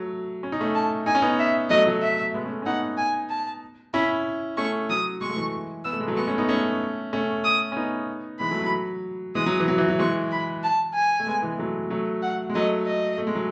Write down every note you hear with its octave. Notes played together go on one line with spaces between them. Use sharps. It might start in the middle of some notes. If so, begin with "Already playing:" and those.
Already playing: F#3 A3
C#4
D#4
A3 C#4
A5
D#4 G#5
C#4
B3 D#4
E5
F#3 A3 D#5
F#3 A3
E5
G#3 B3
A3 C#4
C#4
B3 D#4 F#5
G#5
A5
C#4 E4 B5
A3 C#4 C#6
F#3 D#6
G#3 C#6
A3
E3 G#3
B3 E6
A3
G#3
F#3 A3
G#3 B3 C#6
A3 C#4
B3 D#4
A3 C#4 C#6
A3 C#4
D#6
C#4
B3 D#4
E3 G#3 B5
F#3 A3
F#3
E3 G#3 D#6
F#3
E3
F#3
E3
F#3
E3 G#3 C#6
B5
A5
G#5
A3
G#3 B3
E3 G#3
F#3 A3
F#3 A3
F#5
G#3
F#3 A3 D#5
D#5
A3
G#3
F#3